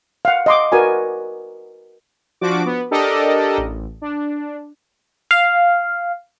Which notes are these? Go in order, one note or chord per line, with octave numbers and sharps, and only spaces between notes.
F5 F#5
D#5 C6 D6
F#4 A#4 B4 D5 G#5
F3 D4 F#4 D6
B3
D4 G4 A4 A#4 D5 D#5
A1
D4
F5